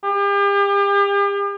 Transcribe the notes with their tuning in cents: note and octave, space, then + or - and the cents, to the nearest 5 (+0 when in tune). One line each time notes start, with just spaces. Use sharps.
G4 +40